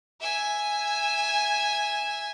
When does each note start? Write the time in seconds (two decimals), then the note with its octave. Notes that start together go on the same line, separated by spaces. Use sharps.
0.21 E5 G#5